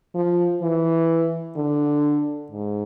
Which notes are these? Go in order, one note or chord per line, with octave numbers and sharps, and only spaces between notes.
F3
E3
D3
G#2